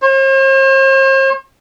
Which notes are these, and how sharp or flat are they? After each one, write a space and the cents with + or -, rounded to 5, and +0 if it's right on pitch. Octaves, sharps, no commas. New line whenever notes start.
C5 +45